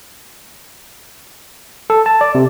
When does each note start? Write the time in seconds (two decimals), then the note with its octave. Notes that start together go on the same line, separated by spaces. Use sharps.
1.90 A4
2.06 A5
2.21 D5
2.35 C3